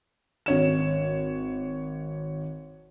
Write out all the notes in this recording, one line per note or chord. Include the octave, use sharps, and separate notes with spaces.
G#1 C#5 E7